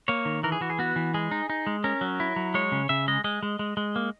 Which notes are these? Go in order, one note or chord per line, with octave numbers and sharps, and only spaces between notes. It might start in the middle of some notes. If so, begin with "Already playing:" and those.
A#3 C#5
D#3
E3 A#4
G#4
E3 F#4
G#4
B3 F#4
E3
G#3 G#4
D#4
D#4
G#3
C#4 A#4
F#3
E4
F#3
G#3 C#5
C#3
C#3 E5
G#3 D#5
G#3 D#5
G#3
G#3
G#3
A#3